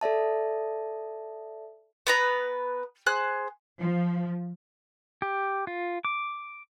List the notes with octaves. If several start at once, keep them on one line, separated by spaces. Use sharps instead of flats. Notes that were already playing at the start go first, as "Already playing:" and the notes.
A4 D5 E5 A5
B3 B4 A#5
G#4 C5 F#6
F3
G4
F4
D6